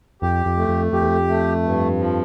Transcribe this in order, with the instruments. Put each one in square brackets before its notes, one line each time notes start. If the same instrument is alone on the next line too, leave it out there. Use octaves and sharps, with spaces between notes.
[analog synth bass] F2 [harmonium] G4
[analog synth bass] F2
[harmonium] A3
[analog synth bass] F2
[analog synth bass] F2 [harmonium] G4
[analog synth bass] E2
F2
[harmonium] A3
G2
F3